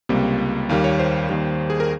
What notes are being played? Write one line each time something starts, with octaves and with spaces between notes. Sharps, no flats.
C#2 C3 G3 A#3
D#2 D#3 G3 A#3 F5
C#5
C5
D#2 D#3 G3
G#4
A#4